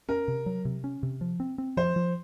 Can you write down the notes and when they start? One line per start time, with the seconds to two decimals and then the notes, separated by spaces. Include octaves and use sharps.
0.09 C#4 A#4
0.28 C3
0.46 F#3
0.65 C3
0.84 C#4
1.03 C3
1.21 F3
1.40 C4
1.58 C4
1.77 F3 C5
1.96 F3